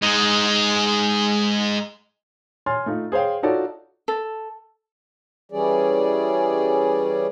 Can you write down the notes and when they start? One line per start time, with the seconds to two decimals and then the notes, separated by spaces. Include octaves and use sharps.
0.03 G#3 D#4
2.66 C#5 G#5 C6 F6 A6
2.86 A3 D#4 F4
3.12 G#4 C5 C#5 F5 G5
3.43 D#4 F4 F#4 A4 C#5 D5
4.08 A4
5.52 E3 G3 C#4 G#4 D5